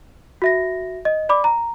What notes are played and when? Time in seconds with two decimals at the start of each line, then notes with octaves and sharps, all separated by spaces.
0.42 F#4 E5 A#6
1.05 D#5
1.29 D5 B5 D6
1.44 A#5